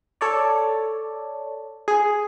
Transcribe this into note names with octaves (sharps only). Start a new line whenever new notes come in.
A4 C#5 D5
G#4